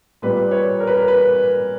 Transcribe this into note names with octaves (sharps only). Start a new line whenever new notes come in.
A#2 G3 A#3 B4
C#5
A#4
B4
A#4
B4